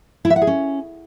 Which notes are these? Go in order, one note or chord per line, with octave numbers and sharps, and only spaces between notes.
E4
E5
F#5
G#4
C#4